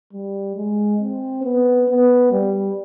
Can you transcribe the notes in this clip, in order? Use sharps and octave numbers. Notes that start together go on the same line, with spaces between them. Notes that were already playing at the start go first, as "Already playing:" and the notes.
G3
G#3
C4
B3
B3
G3